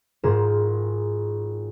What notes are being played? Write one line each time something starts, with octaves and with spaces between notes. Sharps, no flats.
G#1 G#2 F4 G#4 A#4 E7